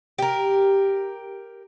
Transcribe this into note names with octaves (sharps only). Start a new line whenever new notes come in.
G4 A#4